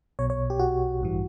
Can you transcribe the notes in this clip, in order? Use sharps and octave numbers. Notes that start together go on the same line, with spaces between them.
B1 B2 C#5
C#5
G4
F#4
A1 G2 E3